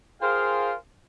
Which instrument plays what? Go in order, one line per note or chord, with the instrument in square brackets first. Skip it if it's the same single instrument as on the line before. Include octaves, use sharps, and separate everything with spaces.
[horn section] F4 G#4 A#4 C5 F5 G5